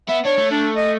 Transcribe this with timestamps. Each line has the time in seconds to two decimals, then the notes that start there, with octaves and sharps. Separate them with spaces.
0.09 B3 E5
0.25 D4 C#5
0.38 A3
0.51 D4
0.76 D#5